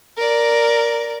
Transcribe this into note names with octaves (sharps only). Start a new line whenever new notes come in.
A#4 D5